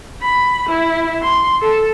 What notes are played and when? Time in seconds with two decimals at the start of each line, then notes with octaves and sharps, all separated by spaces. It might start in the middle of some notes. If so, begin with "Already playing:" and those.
0.21 B5
0.69 E4
1.22 C6
1.61 A4